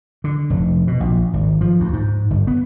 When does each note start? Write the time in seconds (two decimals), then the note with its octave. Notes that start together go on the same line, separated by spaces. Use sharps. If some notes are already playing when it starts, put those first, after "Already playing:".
0.24 D3
0.50 F1
0.87 B2
1.00 A#1
1.33 G#1
1.61 F3
1.80 D2
1.93 G#2
2.30 G1
2.47 B3